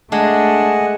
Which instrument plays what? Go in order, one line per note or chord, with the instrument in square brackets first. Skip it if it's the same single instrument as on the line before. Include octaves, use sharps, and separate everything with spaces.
[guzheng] G#3 [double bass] A3 [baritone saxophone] D4 [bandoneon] D#5 F#5 G#5